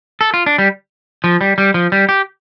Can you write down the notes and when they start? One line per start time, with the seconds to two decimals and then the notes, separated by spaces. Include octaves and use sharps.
0.21 A4
0.34 F4
0.46 D4
0.58 G3
1.24 F3
1.41 G3
1.58 G3
1.74 F3
1.92 G3
2.09 G4